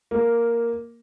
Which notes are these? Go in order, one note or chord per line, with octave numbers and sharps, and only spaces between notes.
A#3